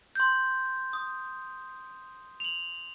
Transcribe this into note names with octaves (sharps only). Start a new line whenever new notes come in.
C6 G6
D#6
F7 F#7